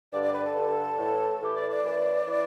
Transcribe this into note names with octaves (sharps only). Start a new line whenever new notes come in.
G2 D3 D5
D5
B4
A4
G2 D3
A2 E3
A2 E3 G4
D5
D5
F#2 E3
E3